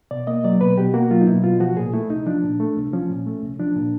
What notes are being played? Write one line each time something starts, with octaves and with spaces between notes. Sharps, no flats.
B2 D5
A#3 D#5
F#3 D5
B2 B4
B2 G4
A#3 F#4
F#3 F4
D#4
B2 E4
B2 F4
F3 F#4
A#2 G#4
A3 E4
C2 D#4
F3 D4
A#2
A3
C2
F3 C#4
A#2
A3
C2
F3 D4
A#2